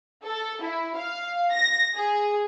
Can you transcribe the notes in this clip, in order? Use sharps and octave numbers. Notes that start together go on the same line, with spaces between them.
A4
E4
F5
A#6
G#4